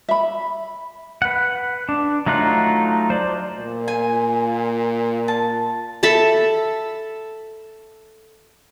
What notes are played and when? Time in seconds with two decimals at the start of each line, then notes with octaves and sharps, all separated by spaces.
0.09 E5 B5
1.22 B4 F#5
1.89 D4
2.26 F#3 A3 D#4 F4 F#6
3.10 C5 D5
3.58 A#2
3.88 G#5
5.28 A5
6.03 A4 E5 A5 B5